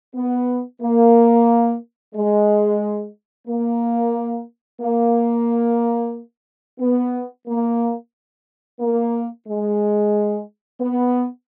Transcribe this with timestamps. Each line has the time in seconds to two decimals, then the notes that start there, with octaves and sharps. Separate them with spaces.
0.15 B3
0.81 A#3
2.14 G#3
3.47 A#3
4.80 A#3
6.80 B3
7.47 A#3
8.80 A#3
9.47 G#3
10.79 B3